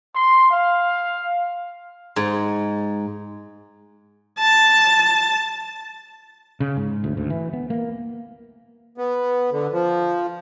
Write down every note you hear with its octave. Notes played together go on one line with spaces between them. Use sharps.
C6
F5
G#2
A5
C#3
G#2
D2
D2
E3
B3
A#3
B3
D3
F3